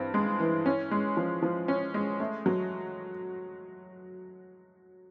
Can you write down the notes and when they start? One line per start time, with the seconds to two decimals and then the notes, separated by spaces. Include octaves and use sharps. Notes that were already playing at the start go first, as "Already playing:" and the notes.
Already playing: G2 E3 C4
0.14 G#3
0.40 E3
0.66 C#4
0.91 G#3
1.17 F3
1.42 F3
1.68 C#4
1.94 G#3
2.20 A3
2.46 F#3